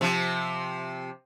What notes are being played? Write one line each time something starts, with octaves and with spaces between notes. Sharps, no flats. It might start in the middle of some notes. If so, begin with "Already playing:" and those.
C3 F3